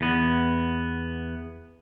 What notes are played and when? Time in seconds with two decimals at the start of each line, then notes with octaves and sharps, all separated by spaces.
0.01 E2 B3